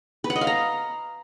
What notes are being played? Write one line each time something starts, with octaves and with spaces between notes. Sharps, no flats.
B4
F#5
D#5
F5
A#5